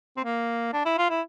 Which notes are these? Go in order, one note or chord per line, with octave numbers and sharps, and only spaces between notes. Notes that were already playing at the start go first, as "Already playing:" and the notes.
C4
A#3
D4
E4
F4
E4